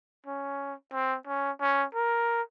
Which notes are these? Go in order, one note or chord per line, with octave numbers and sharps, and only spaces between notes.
C#4
C4
C#4
C#4
A#4